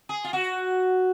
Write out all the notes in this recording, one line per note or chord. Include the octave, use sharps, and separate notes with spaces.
G#4
F4
F#4